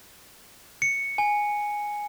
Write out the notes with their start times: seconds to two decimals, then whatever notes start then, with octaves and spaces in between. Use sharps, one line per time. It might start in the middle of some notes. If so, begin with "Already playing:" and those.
0.82 C#7
1.18 G#5